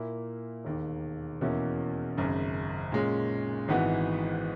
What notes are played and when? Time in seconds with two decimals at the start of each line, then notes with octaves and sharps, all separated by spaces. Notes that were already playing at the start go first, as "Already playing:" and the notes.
Already playing: A#2 A#3 E4
0.65 E1 D#2 D#3
1.41 E2 B2 A#3 C#4 E4
2.17 G#1 F#2 C#3
2.92 A#2 G#3 C#4
3.68 G#1 G#2 E3 B3 F#4